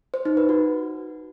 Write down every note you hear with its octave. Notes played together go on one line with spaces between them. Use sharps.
C5
D#4
B4
F#4